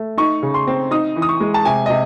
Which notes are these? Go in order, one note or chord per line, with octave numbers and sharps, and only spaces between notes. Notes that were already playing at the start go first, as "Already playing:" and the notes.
Already playing: A3
D#4 C#6
C#3
C6
C4
D#4 D#6
E3
D#6
C#6
G#3
A5
C3 G#5
D#5
C3